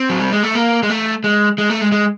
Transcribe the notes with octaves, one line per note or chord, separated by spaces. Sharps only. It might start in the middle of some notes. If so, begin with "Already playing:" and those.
Already playing: C4
F#3
G3
G#3
A3
A#3
G#3
A3
G#3
G#3
A3
G#3
G#3